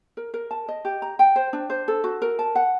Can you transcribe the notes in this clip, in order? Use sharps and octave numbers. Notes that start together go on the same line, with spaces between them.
A#4
A#4
A5
D#5
G4
A#5
G5
C5
D4
C5
A4
F#4
A#4
A5
F#5